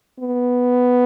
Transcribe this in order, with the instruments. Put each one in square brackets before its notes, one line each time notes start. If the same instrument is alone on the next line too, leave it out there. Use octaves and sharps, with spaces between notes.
[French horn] B3